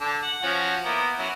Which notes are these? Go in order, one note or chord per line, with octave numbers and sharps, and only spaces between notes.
D3 A4 D5
F#5
F3 C#4 F#4
A#3 B3 E4
F#3 C#4 E4